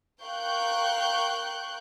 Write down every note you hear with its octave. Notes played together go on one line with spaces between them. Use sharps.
A#4 F5 G5 C#6 F#6 G6